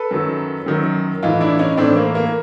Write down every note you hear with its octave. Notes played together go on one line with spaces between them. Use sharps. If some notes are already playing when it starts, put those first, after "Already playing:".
Already playing: A4 B4
F#2 D#3 F#3
F#2 D#3 F#3
A2 E3 D#4 F4
D4 E4
C#4 D#4
A2 E3 C4 D4
A#3
A#3